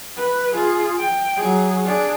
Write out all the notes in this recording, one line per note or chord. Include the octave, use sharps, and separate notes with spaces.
B4
F4 G#4
G5
F#3 G#4
D4 G#4